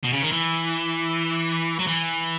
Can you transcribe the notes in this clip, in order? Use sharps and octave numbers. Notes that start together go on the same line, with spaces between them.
B2
C#3
D#3
E3
F#3
E3